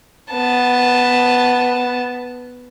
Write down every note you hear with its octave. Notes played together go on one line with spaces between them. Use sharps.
B3 A5